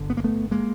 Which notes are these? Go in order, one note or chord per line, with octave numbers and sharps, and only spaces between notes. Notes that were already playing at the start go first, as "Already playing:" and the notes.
Already playing: G1 D3
B3
A#3
A3 B3
G#3 A#3